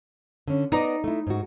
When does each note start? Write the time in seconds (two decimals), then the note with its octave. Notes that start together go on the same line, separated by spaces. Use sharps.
0.48 D3 C#4
0.72 B3 D#4 D5
1.04 A3 E4
1.27 G#2 F#4